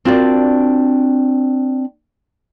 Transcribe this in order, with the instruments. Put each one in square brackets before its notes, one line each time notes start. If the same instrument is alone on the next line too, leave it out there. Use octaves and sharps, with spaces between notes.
[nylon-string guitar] C4 D4 F4 F#4 A#4 D5